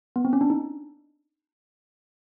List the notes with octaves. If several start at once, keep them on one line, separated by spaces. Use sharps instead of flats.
B3
C4
C#4
D4
D#4